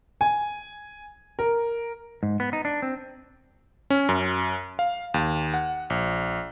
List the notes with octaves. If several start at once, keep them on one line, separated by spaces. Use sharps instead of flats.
G#5
A#4
G#2
B3
D#4
D4
C4
C#4
F#2
F5
D#2
F#5
A#1